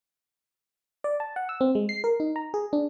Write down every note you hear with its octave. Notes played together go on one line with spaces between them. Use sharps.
D5
A5
F#5
E6
C4
G#3
C7
A#4
D#4
A#5
G#4
D4